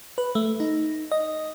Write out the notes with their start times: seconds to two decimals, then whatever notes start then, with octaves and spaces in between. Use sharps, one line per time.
0.18 B4
0.35 A3
0.60 D#4
1.11 D#5